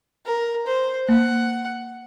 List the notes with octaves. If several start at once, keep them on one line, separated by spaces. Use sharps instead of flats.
A#4
C5
A#3 F#5